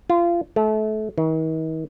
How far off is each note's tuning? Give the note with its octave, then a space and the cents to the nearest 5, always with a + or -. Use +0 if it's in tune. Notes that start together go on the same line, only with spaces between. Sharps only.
F4 -25
A3 -30
D#3 +45